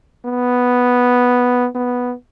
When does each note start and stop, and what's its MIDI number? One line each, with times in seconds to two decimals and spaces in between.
0.25 1.67 59
1.75 2.14 59